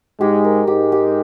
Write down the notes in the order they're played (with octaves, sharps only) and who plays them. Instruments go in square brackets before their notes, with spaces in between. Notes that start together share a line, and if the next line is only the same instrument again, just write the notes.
[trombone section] G#2 G#3 [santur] G4
[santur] A#4
[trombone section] G#2 G#3 [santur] G4
[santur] G4